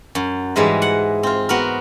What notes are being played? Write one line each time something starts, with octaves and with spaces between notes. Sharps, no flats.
F#2
G#2 E3 G3 G#3
F#5
C4 F4
B3 F#4 A#4